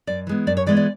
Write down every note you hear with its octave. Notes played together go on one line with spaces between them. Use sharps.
F#2 D5
E3 G#3 B3
F#2 D5
C#5
E3 G#3 B3 D5
D5